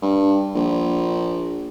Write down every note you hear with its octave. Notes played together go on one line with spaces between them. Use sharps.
G2
A#1